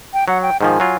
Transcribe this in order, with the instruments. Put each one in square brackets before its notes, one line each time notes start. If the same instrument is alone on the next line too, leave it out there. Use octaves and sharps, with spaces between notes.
[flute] G5
[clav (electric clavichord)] F#3 [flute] F#5
[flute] G5
[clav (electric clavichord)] G#2 D#3 F3 [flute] G#5
[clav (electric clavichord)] F#3 F4